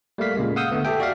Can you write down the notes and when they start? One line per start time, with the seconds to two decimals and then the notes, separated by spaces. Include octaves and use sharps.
0.18 G3 A3 A#3 F5 B6
0.36 A#2 C#3 G#3 A#3
0.56 F5 F#5 D#6 E6 G6
0.71 D3 A3 B3
0.85 G4 A4 E5 G5
1.00 F#4 D5 E5 F5